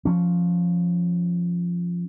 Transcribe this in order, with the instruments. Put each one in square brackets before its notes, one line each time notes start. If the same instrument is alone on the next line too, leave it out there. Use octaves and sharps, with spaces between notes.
[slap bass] F3 C#4